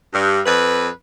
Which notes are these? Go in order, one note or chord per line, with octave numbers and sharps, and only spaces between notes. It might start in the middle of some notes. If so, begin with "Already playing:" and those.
G2
F2 B4